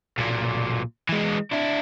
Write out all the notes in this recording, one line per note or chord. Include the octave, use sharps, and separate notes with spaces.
B1 A#2
E3 G#3
D4 E4